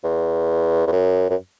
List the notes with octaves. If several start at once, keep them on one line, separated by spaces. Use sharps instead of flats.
E2
E2
F#2
F#2